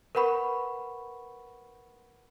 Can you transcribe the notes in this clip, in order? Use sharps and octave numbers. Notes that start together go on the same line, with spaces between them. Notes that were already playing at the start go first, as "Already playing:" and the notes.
A#4 B4 F#5 B5 C#6